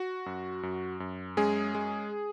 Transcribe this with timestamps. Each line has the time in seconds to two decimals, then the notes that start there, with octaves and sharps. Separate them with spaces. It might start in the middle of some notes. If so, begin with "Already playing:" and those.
Already playing: F#4
0.26 F#2
0.63 F#2
1.00 F#2
1.37 G#3 C#4 G#4
1.75 G#3